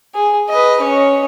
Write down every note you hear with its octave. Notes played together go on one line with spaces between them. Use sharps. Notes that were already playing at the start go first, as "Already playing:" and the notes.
G#4
B4 D#5
C#4 C#5